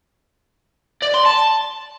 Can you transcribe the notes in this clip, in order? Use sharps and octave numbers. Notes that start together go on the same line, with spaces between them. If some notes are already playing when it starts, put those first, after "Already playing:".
D5
C6
A5